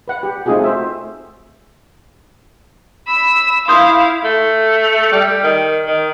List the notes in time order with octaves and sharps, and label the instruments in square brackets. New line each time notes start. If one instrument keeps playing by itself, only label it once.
[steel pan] B4 F#5
G4
A3 C4 D#4 F4 F#4 G#4
C5 E5
[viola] B5 [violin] E6
[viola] E4 [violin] F5 [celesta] C6 D#6 G6
[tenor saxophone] A3
G3
D#3
D#3